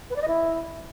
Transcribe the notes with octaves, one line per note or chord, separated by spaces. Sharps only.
B4
D5
D#5
E4